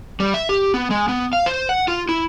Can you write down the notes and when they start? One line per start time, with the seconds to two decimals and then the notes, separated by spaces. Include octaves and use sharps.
0.20 G3
0.34 E5
0.49 G4
0.74 B3
0.90 G#3
1.09 B3
1.33 F5
1.46 C5
1.69 F#5
1.88 F4
2.09 E4